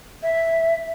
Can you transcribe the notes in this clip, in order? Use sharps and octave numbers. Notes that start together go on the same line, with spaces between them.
E5